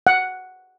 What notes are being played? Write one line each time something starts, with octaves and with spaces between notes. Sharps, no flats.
F#5